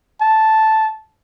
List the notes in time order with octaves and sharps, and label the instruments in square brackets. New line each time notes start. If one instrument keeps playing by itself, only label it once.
[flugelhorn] A5